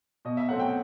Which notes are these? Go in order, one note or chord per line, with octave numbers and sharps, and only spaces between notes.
B2 D#5
E5
F#3 A3 C4 F#5
G5